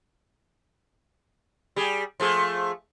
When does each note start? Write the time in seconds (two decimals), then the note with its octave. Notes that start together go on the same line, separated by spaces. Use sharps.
1.76 G3 G#4
2.20 F3 A3 G#4